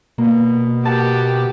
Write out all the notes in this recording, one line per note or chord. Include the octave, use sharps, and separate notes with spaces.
B2 A#3
F#4 G4 A#4 F#5 A5